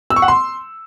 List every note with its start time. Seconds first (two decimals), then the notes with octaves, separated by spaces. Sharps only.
0.10 E6
0.16 C#6
0.22 F#5
0.28 C6